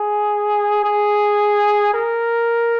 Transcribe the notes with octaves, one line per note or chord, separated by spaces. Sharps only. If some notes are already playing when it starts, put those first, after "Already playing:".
Already playing: G#4
G#4
A#4